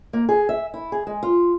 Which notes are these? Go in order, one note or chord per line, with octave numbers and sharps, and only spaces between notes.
A#3
G#4
E5
E4
G#4
G#3
F4